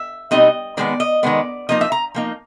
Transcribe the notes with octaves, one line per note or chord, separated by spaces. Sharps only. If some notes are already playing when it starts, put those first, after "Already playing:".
Already playing: E5
B2 G3 C4 D#4 D#5
D#3 G#3 B3 D5
D#5
D#3 G#3 B3 D5
F3 A#3 D#4 D#5
E5
A#5
F3 A#3 D#4